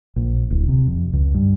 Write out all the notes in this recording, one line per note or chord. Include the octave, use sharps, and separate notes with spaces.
A#1
D1
C3
F2
C#2
G2